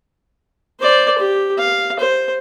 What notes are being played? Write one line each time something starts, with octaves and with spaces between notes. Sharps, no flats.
C5 D5
G4
F5
C5